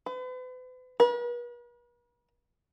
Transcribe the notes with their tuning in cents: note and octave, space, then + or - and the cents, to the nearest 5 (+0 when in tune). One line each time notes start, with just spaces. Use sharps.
B4 +40
B4 -45